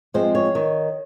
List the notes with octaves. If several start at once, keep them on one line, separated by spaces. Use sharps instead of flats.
F3 G#3 C4 C5
C#5
D#3